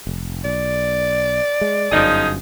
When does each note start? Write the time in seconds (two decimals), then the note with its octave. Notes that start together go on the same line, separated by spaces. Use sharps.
0.07 F1
0.45 B1 D5
1.61 G#3
1.92 G1 F#2 F3 D#4 G#4